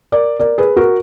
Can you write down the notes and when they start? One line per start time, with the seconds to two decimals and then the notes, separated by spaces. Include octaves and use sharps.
0.12 A#4 D5
0.40 A#4 D5
0.58 G#4 B4
0.76 F#4 A#4